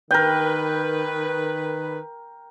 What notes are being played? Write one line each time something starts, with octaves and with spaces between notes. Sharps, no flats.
D#3 A#4 B4 G5